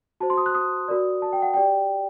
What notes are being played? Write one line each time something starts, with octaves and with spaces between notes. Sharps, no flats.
F#4 C5 A5
C6
D#6
F#6
D#6
F#4 A#4 D5
A5
G5
F#5
G4 D5 G5